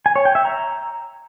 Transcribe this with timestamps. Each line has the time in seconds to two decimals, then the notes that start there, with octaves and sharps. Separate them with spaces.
0.06 G#5
0.16 C#5
0.25 G5
0.35 E5
0.45 A#5